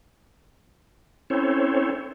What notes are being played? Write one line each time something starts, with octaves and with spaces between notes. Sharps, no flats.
C4 C#4 E4 A4 C5 C#5